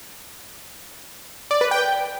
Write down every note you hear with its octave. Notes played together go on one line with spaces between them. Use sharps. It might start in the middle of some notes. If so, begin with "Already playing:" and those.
D5
B4
G5